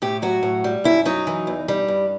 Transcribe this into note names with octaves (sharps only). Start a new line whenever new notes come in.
A2 G4
F#3 F#4
A2
G3
F#2 E4
F#3 D#4
E3
E2
G3
G2